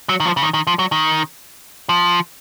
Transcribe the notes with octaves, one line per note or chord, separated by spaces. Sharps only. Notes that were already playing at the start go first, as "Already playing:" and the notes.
F#3
D#3
F3
C#3
D#3
D#3
F3
F#3
D#3
F3